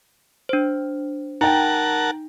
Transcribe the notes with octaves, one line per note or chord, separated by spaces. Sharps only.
D4 C5
D#4 A#4 F#5 G5 A5 A#5